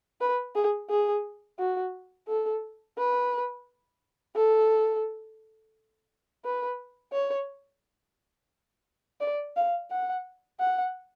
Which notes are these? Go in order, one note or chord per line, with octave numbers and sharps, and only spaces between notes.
B4
G#4
G#4
F#4
A4
B4
A4
B4
C#5
D5
F5
F#5
F#5